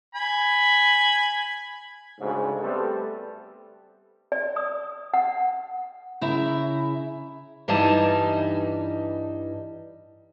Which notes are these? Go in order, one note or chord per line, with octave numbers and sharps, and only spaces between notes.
G#5 B5
D2 G#2 C#3
G3 A3 B3 C4 A4
D5
D#6
F#5
C#3 E4 E5 A#5
G2 E3 G3 D#4 A5